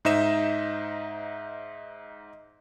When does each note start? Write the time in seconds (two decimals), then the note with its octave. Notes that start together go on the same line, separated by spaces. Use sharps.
0.05 G#2 D#4 C5 D#5 E5 E7